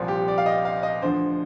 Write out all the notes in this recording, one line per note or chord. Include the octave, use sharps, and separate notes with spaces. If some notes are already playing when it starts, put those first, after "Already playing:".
Already playing: C2 A#2 F3
G4
D5
F5
D#5
F5
D#5
D2 D3 F3 C5